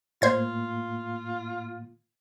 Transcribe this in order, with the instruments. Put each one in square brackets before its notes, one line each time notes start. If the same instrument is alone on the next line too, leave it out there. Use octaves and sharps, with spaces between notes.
[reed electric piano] A2 A#3 [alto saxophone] F4 [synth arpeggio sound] C5 G#6